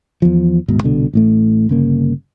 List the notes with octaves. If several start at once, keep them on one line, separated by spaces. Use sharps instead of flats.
E2 F3
D#1 G#2 B2
C2 B2 D3
A1 A2 A3
G1 C#3 A#3